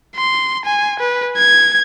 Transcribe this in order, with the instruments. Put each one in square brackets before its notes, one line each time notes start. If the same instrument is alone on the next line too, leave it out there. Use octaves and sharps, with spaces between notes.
[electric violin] C6
G#5
B4
G#6